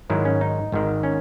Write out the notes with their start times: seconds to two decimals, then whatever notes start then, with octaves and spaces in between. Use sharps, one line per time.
0.10 G#2 D#3 F#3 E4
0.25 C#4
0.41 D#4
0.72 G#1 G#2 D#3
1.03 C#4